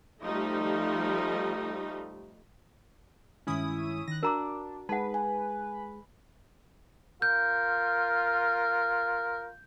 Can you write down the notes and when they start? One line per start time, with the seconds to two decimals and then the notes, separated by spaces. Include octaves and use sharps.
0.24 F3 G3 A3 D#4
3.47 G2 D#3 G#3 C#4 E4 D#6
4.08 D#3 F#6 A#6
4.23 D4 F#4 A#4 A#5 D6
4.89 G#3 D#4 G#4 B4 F#5
5.14 G#5
7.22 F4 A#4 G6